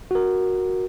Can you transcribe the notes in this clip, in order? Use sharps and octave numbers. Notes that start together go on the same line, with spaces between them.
F#4 A#4